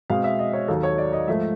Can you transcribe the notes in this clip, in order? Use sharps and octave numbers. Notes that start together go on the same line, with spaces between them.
B2 G#3 C4 F5
E5
D#5
C#5
D#2 D#3 F#3 A4
C#5
D5
D#5
G#2 F3 A3 E5